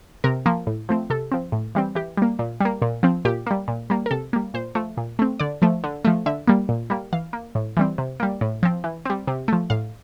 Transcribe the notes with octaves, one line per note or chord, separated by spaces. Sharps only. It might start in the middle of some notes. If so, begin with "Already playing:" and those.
C3 A#4
F3 A#3
A2
F3 A3 C4
C3 A4
F3 C4
A2
E3 G3 C4
E3 G4
G3 A#3
A#2
G3 A#3
A#2
F3 C4
A#2 G4
G3 A#3
A#2
G3 A#3
A#4
C3 A4
G3 A#3
A#2 C5
F3 A3
A#2
A3 C4
D3 D5
F3 A3
D3
F3 A3
D3 E5
G3 A#3
A#2
G3 A#3
E3 F5
A#3
A2
E3 G3 C4
C3
G3 A#3
A2
F3 C4
E3
G3 C4
C3
F3 A3
A2 F5